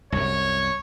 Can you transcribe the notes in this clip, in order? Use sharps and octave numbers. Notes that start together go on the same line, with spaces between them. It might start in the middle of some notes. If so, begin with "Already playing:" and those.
C2 F#2 C#5